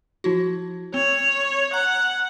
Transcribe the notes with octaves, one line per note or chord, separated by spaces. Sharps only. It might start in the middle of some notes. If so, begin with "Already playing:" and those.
F3 E4 F#4
C4 C#5
F#5 A#5